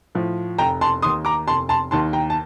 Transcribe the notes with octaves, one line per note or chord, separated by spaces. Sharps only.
A2 F3
F1 G5 A#5
A5 C6
D#2 D#3 C6 D#6
A#5 D6
F1 A5 C6
A5 C6
D#2 D#3 A5 C6
G5 A#5
A5